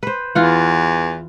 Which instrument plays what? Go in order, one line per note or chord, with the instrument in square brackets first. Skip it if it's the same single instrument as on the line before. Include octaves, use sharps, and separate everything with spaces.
[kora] B4 C5
[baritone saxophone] E2 [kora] E3 F4 F#5